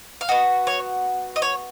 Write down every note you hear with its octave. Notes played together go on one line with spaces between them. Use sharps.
F5
B3 F#4 D#5
C#5
D#5
C#5